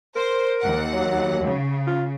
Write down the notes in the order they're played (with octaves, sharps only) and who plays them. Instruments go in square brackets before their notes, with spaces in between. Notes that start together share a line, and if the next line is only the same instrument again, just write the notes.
[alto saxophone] A#4 [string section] C5
[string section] D#2 F#5
[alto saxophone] F#3
[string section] C#3
[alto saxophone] F4